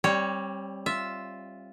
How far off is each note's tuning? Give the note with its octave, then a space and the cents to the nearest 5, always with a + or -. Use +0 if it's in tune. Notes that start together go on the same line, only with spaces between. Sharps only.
G3 +0 C4 +30 C#5 +0
F4 +0 E5 +0